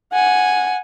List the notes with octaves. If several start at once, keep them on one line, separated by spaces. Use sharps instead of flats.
F#5 G#5